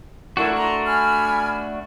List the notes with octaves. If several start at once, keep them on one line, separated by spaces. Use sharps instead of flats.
A3 D4 E4 F#4 A#4
A#5 C6
G#5 B5 F6